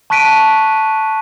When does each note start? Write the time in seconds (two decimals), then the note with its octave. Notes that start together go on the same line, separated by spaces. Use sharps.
0.10 A5 C#6 F#6 B6 D7 D#7